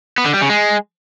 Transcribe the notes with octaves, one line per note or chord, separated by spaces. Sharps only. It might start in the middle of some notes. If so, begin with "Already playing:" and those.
B3
D3
G3
C#3
G#3